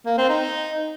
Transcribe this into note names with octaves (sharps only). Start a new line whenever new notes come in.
A#3
C4
D#4